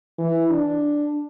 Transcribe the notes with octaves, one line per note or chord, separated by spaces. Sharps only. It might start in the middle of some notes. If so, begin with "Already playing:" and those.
E3
D4